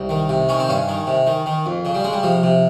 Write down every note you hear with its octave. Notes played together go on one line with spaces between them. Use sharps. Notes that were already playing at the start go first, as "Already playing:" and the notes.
Already playing: C2 D#4
D#3
C3
D#3 C#4
C4
G2 C#4
D#3
C3
D#3
D#3
F2
C#3
G3
C#3 G#3
G3
C3 F3
C3